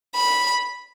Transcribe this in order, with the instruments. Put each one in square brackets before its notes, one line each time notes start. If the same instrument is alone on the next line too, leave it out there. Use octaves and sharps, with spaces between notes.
[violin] B5